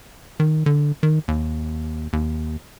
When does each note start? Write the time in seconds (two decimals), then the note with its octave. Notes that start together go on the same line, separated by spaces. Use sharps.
0.40 D#3
0.66 D3
1.03 D#3
1.28 D#2
2.13 D#2